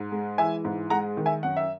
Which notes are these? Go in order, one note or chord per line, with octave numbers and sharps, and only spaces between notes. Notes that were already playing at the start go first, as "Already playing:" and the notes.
Already playing: G#2
G#3
E3 E5 G#5
G#2
G#3 F#5 A#5
D#3
E5 G#5
F#2 F#5
E5